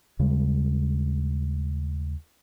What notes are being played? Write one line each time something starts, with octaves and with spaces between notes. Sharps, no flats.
D#2 C#3 G3 G#3